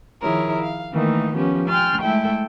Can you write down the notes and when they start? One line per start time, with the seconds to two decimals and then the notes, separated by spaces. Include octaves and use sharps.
0.22 D#3 F3 E4 G#4 A#4 C#5
0.62 F5
0.92 D#3 E3 A3 A#3 D#4
1.34 F3 B3 C#4 G4
1.68 G5 G#5 C6 F6 A6
2.01 G#3 A3 E4 A4 E5 G5